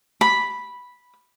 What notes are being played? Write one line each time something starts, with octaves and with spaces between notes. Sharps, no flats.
B5